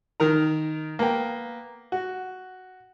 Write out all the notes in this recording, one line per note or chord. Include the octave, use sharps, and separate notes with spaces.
D#3 A#4 A#5
A#3 B3 G5
F#4